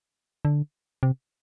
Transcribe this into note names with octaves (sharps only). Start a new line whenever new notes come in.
D3
C3